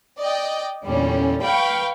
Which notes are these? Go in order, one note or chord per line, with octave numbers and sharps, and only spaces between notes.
D5 D#5 G5
E2 A#2 D3 G3 C#4
B4 F5 G5 B5 C#6